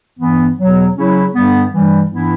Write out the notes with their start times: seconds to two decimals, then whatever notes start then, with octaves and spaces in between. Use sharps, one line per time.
0.18 G2 E3 B3
0.56 E2 B2 F#3
0.95 C#3 F#3 C#4 E4
1.32 G2 D3 G3 B3
1.71 G2 E3 G3
2.09 G2 E3 B3 E4